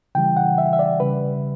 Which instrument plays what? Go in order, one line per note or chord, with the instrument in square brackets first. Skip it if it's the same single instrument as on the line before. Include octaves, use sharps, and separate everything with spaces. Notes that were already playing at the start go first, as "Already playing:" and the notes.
[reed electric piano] C#3 E3 G3 G5
F#5
E5
E5
D5
C#3 G3 B4